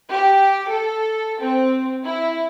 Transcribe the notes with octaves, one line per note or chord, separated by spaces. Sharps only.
G4
A4
C4
E4